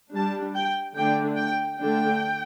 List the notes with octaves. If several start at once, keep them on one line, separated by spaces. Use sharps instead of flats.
G3 D4 A5
G5
D3 A3 D4 G5
G5
D3 A3 D4 G5